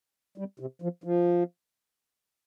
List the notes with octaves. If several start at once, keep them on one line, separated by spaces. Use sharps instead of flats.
G3
C3
F3
F3